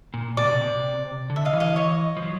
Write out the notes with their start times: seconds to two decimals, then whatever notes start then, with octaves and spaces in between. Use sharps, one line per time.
0.14 A#2
0.37 B2 D5
0.45 C3
0.52 B2
0.61 C3
1.30 D3
1.36 E5
1.45 D#5 F5
1.53 E3
1.60 D#5 F5
1.76 C#5 D#5
2.17 F3
2.23 F#3